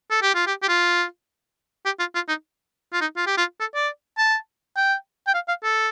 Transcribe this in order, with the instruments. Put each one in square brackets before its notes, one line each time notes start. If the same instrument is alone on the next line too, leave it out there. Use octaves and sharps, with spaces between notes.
[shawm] A4
G4
F4
G4
G4
F4
G4
F4
F4
D#4
F4
D#4
F4
G4
F4
A4
D5
A5
G5
G5
F5
F5
A4